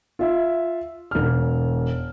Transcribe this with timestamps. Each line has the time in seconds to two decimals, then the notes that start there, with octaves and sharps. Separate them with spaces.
0.19 F4 E5
1.11 E1 F6